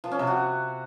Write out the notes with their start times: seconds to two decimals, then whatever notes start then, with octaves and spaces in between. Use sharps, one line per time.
0.04 F3
0.12 C#4
0.19 C3
0.27 F#4